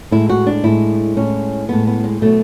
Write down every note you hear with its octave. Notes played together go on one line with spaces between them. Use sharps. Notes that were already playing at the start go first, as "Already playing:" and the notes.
A2 G#3 E4
F#4
D4
A2 G#3 E4
A2 G#3 C#4
A2 G#3 B3
B3
G#3
B2 F#3 A3